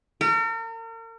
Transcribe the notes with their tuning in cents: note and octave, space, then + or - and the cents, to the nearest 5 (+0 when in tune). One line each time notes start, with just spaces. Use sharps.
A#4 -40